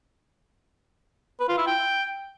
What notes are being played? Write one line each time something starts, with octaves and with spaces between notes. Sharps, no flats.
B4
F4
E4
G5